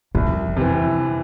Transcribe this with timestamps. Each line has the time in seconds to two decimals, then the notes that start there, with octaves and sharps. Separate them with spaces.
0.15 C2 F2
0.57 C3 E3